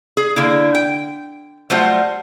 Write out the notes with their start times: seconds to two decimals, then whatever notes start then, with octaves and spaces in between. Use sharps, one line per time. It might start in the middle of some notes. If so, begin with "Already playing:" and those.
0.17 G#4
0.36 D3 A#3 E4
0.75 G5
1.70 F#3 G3 A3 F4 C5 F#5